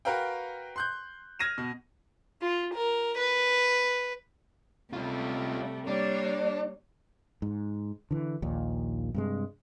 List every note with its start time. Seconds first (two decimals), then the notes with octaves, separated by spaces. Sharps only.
0.05 F#4 A#4 B4 F5 G5
0.76 C6 F#6 G6
1.39 F6 G#6 A#6 D#7 E7
1.58 B2
2.42 F4
2.74 A#4
3.18 B4
4.93 C3 G3 A3 C#4 F4
5.87 G3 A#3 D4 C#5
7.42 G#2
8.11 D3 E3
8.42 A#1 D#2 A#2
9.14 G2 C3 G#3